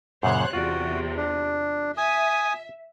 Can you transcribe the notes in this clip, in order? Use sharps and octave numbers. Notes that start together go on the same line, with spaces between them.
F#2 A#2 C#3 C5 C#5 F#6
E2 C3 F4 F#4 D5
D4
E5 G#5 D#6